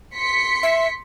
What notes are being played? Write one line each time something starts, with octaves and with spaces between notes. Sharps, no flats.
C6 B6 C#7
E5